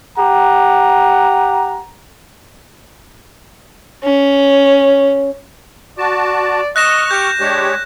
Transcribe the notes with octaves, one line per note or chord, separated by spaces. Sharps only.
G4 F#5 A#5
C#4
F#4 D5 A5
D#5 C#6 F6 F#6 A#6 E7
G4 G6
G#3 D4 G4 C#5